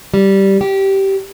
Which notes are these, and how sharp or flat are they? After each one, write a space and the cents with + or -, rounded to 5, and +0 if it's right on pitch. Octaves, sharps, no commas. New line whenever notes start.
G3 -10
G4 -15